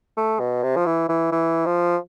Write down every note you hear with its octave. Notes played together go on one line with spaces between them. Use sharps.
A3
B2
C3
F3
E3
E3
E3
F3